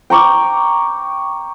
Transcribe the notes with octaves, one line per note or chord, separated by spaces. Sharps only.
G5 A#5 C#6 D6